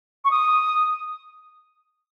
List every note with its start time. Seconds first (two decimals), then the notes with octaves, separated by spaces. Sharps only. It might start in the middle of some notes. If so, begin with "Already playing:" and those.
0.25 C#6
0.31 D#6